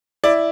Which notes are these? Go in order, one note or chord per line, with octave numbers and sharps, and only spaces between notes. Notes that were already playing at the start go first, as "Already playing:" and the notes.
E4 D5